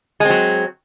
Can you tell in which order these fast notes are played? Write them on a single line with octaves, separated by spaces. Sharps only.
G#3 C4 F#3